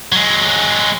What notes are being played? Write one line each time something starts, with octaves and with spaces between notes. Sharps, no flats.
F#3 G#3